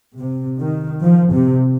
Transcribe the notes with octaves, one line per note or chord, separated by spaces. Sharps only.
C3
D#3
F3
C3